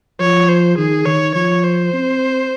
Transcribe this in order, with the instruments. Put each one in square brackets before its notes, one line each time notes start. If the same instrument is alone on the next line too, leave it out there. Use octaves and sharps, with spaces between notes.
[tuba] F3 [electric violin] C#5
[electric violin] C5
[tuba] D#3 [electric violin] G#4
[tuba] D#3 [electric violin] C#5
[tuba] F3 [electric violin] C#5
[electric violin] C5
[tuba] C4